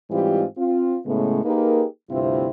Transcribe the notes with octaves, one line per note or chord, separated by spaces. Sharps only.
G#2 E3 G3 C4 F4 G4
C4 F4
A2 C#3 G#3 A3 B3
A#3 D#4 G4 G#4 A#4 B4
D2 G2 C3 C4 E4 F4